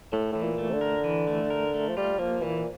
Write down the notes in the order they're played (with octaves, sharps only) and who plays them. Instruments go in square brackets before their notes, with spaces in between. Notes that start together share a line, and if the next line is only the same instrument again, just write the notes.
[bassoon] A2 [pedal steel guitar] A3
[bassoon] A2 [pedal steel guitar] E3
[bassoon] A#2
[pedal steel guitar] A3
[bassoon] C3
D3
[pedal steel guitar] A#4
E3
A3
A#4
A3
[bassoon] F3
[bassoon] G3 [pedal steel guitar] F4
[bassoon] F3 [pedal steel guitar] A#3
[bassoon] A#2 [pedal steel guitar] E3